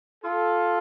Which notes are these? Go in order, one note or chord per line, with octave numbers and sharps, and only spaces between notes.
F4 A4